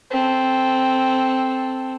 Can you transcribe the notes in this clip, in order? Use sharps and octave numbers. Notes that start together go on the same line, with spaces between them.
C4 A4